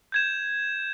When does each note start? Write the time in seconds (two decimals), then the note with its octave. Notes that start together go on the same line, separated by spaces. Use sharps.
0.12 G6 G#6 E7